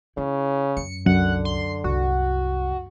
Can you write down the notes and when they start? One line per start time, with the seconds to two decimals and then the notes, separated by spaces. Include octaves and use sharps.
0.17 C#3 E4
0.77 F#2 C#7
1.06 C2 F#2 D3 F#5
1.45 C6
1.84 C2 F#4